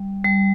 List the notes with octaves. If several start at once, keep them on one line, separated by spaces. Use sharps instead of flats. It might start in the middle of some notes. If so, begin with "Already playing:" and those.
Already playing: G3
G3